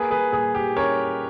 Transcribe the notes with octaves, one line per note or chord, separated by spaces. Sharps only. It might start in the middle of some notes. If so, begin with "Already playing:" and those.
Already playing: A#3 G#4 B4
G#4 B4
A#2 G#4
G4
C#4 A#4 C#5